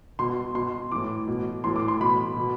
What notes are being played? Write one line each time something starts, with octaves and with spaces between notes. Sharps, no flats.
B2 C6
B2 C6
A2 E3 D6
B2
A2 E3 C6
D6
C6
B2 B5
B2